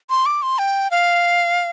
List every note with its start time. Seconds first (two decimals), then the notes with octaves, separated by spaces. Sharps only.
0.10 C6
0.26 D6
0.42 C6
0.59 G5
0.91 F5